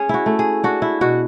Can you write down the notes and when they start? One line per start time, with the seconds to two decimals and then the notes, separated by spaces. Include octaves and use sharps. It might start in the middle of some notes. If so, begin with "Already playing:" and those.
Already playing: C#4 G#4
0.09 E4 F#4
0.26 A3
0.39 G#4
0.64 D4 F#4
0.82 E4
1.01 B2 F#4